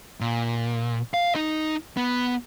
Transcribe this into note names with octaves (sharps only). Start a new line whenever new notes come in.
A#2
F5
D#4 D#5
B3